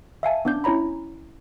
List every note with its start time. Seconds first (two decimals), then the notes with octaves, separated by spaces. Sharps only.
0.23 E5 F5 G#5 A5
0.45 B3 C#4 D4 D6 G6
0.64 C#4 E4 C#5 A#5 B5